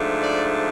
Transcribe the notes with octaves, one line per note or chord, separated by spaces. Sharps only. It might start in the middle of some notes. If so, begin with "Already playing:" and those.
Already playing: G#2 F3 A3 D4
D5